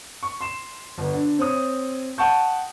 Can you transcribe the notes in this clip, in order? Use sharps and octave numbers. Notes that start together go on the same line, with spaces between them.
C#6
C6 E7
G1
D3
C4 C#5 D#6
F#5 G5 A5 C#6 G6